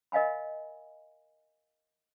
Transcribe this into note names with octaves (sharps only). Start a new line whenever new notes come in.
A#4 D#5 F5 G#5 B5